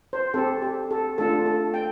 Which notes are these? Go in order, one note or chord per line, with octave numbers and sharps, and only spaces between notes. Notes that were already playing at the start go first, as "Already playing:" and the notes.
C5
C4 G4 A4
G4
A4
A3 D4 F4 A4
A4
G5